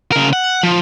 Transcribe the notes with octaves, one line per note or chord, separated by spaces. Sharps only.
C#3 A#4
F#5
F3